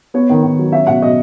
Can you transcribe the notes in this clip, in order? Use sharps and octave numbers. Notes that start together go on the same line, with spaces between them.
B3 C#5
D#3
D#3
F#3
C#4 E5
B2 F#5
B2 D#5